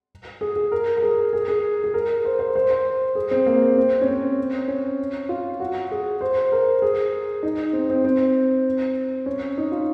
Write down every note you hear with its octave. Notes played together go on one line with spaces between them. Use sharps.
G#4
G#4
A#4
A#4
G#4
G#4
G#4
G#4
A#4
C5
C5
C5
C5
G#4
C4
A#3
C4
C#4
C4
C#4
F4
F#4
G#4
C5
A#4
G#4
D#4
C4
C4
C4
C#4
D#4
F4